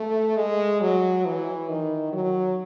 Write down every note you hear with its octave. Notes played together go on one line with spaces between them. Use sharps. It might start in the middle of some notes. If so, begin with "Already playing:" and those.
Already playing: A3
G#3
F#3
E3
D#3
F#3